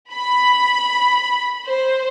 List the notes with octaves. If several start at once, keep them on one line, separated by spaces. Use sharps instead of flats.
B5
C5